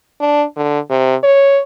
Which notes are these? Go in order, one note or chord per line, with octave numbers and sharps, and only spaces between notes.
D4
D3
C3
C#5